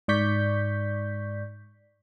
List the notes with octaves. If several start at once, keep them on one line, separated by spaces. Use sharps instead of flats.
G#2 D5 C#6 G6 B6